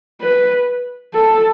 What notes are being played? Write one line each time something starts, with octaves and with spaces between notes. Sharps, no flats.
B4
A4